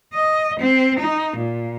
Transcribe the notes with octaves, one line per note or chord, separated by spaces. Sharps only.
D#5
C4
D#4
A#2